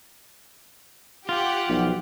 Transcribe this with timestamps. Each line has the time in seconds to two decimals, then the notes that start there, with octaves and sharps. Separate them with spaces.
1.29 F4 G4 F#5
1.69 B1 F3